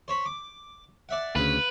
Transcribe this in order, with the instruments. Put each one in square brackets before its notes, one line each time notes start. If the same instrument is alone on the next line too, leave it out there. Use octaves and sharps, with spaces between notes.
[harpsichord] C5 C#5 B5
D6
D5 E5 F#5
[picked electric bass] D2 C#3 [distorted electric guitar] B4 [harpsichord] F5